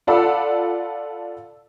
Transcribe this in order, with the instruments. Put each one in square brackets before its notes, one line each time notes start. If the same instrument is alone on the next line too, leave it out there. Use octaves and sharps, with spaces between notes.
[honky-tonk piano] F4 A4 D5 F#5 B5 E6